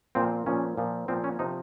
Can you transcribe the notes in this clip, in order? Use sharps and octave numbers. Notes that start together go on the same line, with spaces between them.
A#2 F3 C4
A#2 F3 C#4
A#2 F3
A#2 F3 C4
C#4
C3 F3 D#4